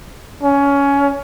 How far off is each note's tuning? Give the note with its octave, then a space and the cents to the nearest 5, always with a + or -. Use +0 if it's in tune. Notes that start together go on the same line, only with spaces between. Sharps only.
C#4 +20